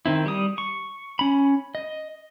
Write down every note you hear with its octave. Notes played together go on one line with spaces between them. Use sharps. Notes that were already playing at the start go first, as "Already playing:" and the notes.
D#3 C4 E4
G3 D#6
C#6
C#4 B5
D#5